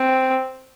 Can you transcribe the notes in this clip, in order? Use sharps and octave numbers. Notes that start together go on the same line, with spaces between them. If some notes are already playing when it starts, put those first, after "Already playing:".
Already playing: C4